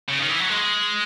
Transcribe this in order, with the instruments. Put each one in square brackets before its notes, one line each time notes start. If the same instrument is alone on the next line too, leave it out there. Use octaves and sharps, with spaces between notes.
[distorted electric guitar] C#3
D#3
E3
F#3
G#3